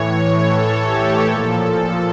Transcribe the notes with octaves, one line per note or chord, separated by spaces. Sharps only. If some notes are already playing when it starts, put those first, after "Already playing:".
Already playing: A2 E3 C#5
A4
G4
A#2 F3 A4